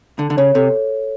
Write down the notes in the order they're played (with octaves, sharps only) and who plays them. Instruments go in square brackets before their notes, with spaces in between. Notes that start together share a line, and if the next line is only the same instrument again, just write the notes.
[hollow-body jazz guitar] D3 [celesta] A4
[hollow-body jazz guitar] D3
[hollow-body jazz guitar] C#3 [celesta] C#5
[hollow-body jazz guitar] C3 [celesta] A4